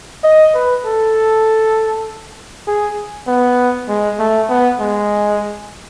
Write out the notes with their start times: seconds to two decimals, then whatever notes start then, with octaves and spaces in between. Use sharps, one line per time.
0.24 D#5
0.54 B4
0.85 A4
2.67 G#4
3.27 B3
3.88 G#3
4.19 A3
4.50 B3
4.80 G#3